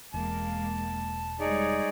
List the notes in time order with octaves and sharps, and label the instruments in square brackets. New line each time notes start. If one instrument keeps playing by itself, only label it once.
[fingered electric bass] E1 [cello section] G#3 A#3 [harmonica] A5
[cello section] G3 G#3 C#5 [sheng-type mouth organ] D#4 G#4 D5